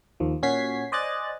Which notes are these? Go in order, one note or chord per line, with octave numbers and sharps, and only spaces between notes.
D#2 F3
A#2 C#4 F#4 G#6 B6 C7
C5 D5 D#5 G#5 F#6 A6